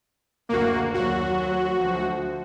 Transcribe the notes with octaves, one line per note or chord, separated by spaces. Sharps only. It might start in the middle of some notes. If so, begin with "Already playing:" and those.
F#1 D2 A#3 F#4
D#2 F#3 F#4
D2 F3